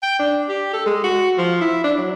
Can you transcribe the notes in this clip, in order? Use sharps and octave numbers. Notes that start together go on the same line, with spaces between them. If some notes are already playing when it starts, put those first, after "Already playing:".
G5
D4
G4
A4
G#3
F#4
F3
E4
D4
F#3